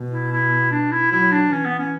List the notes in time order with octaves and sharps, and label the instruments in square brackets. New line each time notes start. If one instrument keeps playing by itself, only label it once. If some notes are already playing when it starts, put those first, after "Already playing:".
Already playing: [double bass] B2
[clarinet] E4
E4
D4
E4
[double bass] F#3 [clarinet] E4
[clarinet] D4
[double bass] E3 [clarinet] C#4
[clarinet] B3
C#4